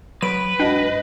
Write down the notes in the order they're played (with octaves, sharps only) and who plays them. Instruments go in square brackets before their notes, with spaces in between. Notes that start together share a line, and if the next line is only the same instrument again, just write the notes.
[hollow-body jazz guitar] F#3 [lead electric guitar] B4 [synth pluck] D7
[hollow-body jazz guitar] G#2 F#4 G5 [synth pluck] D4 [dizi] D#5